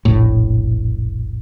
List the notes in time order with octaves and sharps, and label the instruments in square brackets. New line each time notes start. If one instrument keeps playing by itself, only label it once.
[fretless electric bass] F1 A#1 A2